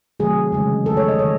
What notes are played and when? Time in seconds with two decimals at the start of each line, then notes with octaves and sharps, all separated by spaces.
0.20 C3 D#3 F#3 A3 G#4
0.52 C#3 E3 G#3
0.86 D#3 A3 A4
0.97 C#5
1.08 D#5
1.19 D#3 G#3 C#5